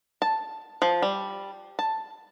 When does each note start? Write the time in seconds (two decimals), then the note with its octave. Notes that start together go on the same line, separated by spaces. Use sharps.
0.22 A5
0.82 F3
1.02 G3
1.79 A5